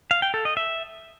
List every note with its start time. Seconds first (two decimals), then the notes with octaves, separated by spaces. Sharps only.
0.11 F5
0.22 G5
0.34 A4
0.45 D#5
0.57 E5